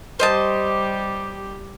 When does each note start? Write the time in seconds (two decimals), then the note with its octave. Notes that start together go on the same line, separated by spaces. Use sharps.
0.19 G3 G4 C5 D#5 A5